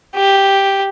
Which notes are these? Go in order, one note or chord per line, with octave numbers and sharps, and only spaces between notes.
G4